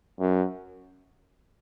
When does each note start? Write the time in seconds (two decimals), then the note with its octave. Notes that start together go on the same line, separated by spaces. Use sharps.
0.20 F#2